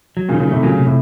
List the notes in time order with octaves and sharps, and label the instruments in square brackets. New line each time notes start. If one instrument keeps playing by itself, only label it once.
[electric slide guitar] F#3
[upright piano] A#2 C#3
[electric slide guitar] D#3
[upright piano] A#2 C#3
[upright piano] A2 C3 [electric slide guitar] A3
[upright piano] A#2 C#3 [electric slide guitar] F#3
[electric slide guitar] C3
[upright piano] A2